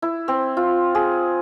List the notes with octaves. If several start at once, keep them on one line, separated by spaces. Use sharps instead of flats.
E4
C4
F4
G#4